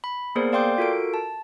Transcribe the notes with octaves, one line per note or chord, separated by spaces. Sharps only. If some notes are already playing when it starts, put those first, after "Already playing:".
B5
A#3 B3 G#4 A#4 C5 D5
D5 F5 G5 C6 D6 G6
F4 F#4 A4 A#4 D7
A5